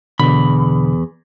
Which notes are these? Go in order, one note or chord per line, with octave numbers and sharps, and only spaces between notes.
E2 B2 D3 B5